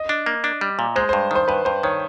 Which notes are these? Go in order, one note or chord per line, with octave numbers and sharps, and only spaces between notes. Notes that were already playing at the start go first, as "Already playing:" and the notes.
Already playing: D#5
D4
A#3
D4
G3
A#2
G#3 C5
G2 C5
D#3 C5
G2 B4
G2 C5
D#3 C#5